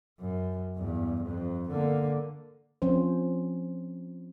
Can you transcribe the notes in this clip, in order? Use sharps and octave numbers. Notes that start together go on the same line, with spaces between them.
F#2
E2 G2
F2
D3 A#3
F3 C4 C#4 C5